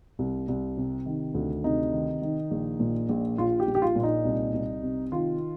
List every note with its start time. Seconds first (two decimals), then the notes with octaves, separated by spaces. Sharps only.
0.19 C2
0.48 C2
0.77 C3
1.06 D#3
1.34 D2
1.64 C3 D#4
1.93 D#3
2.22 D#3
2.51 A#1
2.80 A#2
3.09 A#1
3.38 A#1 F4
3.60 G4
3.67 A#1
3.75 G4
3.82 F4
3.96 A#2 F4
4.03 D#4
4.25 C2
4.54 C2
4.83 C3
5.12 D#3 F4